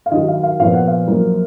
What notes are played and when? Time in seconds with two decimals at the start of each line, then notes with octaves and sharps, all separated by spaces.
0.06 F5
0.12 D#2 D#3 F#3 D#5
0.28 F5
0.43 F5
0.59 A#2 F3 B3 F5
0.74 F#5
0.88 F5
1.08 F#2 F3 A#3